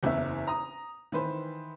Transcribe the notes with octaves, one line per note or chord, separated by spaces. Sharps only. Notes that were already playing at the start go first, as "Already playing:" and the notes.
F#1 E2 C#4 E5
A#5 D#6
D#3 E3 B4 C5